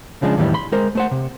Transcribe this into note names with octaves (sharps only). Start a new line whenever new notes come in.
C#3 F3 G#3 D4
E2 A2 D#3 E3 G3
B5 C6
G#3 A#4 C5
A3 C5 F#5
C3